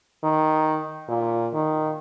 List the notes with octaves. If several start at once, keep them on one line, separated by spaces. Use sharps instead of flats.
D#3
A#2
D#3